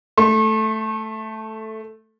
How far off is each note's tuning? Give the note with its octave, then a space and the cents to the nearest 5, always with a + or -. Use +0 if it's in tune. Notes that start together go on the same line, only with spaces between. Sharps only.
A3 +0 C#6 -35